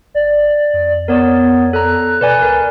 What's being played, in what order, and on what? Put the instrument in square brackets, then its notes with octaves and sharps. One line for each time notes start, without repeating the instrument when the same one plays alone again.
[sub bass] G1 [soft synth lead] D5
[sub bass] F2
[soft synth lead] B3 [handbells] A#4 C#5 D5
[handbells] A4 A#5 [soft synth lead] F#6
[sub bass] B2 [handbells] B4 D5 G#5
[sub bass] C#2 [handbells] A#4